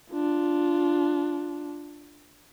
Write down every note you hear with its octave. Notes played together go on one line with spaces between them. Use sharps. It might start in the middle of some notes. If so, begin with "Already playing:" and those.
D4 F4